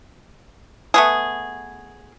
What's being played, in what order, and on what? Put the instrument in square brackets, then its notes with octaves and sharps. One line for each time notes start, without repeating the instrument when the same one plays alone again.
[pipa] A3 B3 G#4